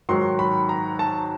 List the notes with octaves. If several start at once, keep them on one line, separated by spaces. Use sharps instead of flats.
G#2 D#3 F#3 C6
B5
A#5
A5